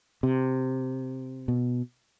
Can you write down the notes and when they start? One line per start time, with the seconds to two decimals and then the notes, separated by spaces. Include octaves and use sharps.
0.23 C3
1.48 B2